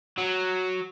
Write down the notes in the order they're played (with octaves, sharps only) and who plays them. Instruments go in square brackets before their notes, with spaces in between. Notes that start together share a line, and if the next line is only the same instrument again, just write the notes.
[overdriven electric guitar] F#3